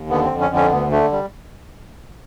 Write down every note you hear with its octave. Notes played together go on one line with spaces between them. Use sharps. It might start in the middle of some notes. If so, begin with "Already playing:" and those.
Already playing: D#2
D3 B3
F2 C4
C#4
D3
C#4
D2 B3
D3 A3
G3